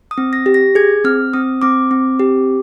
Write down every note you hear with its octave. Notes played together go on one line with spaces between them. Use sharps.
D#6
C4
A#6
G4
A#6
G#4 G#6
C4 F6
C4 D#6
C4 D6
C4
G4